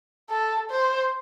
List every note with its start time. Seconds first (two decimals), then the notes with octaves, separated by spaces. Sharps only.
0.30 A4
0.70 C5